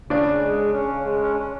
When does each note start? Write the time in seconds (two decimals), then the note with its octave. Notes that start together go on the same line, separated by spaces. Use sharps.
0.10 C#3 D4 D5
0.27 C#3
0.42 G#3
0.58 C#3
0.74 C#4
0.91 C#3
1.06 G#3
1.22 C#4
1.38 C#4